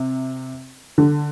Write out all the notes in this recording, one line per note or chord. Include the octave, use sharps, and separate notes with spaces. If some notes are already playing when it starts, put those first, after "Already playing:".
Already playing: C3
D3